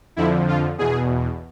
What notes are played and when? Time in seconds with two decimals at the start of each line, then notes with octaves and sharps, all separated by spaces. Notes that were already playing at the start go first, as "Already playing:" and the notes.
0.16 F2 D3 F3 E4
0.48 F4
0.78 E2 B2 G#4